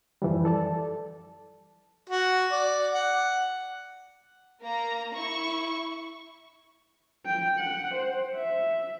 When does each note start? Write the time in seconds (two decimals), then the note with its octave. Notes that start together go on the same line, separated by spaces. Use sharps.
0.22 F#2 E3 F3 G3
0.45 A4 D5 A5
2.10 F#4
2.52 D5
2.94 F#5
4.61 A#3 A#5
5.15 E4 C#6
7.25 G5
7.59 F#5
7.94 C5
8.35 E5